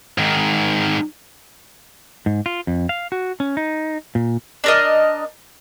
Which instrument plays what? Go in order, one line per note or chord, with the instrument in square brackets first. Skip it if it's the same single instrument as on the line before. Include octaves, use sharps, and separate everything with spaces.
[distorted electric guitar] G#2 D#3
[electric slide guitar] G#2
F4
F2
F5
F#4
C#4
D#4
A#2
[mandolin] D4 A#4 D#5